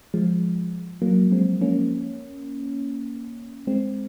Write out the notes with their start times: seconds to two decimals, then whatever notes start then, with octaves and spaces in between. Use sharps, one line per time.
0.14 F3 G#3
1.02 F#3 A#3
1.32 G#3 C4
1.61 A#3 C#4
3.67 G#3 C4